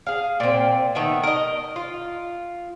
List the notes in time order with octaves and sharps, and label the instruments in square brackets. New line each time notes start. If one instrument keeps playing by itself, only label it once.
[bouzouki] G#4 F5
A#2 C4
D#3 A3 B3 E5
A#4 D#5
F4